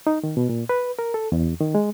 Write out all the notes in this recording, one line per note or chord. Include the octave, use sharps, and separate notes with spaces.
D#4
D#3
B2
A#2
B4
A#4
A4
E2
D#3
G#3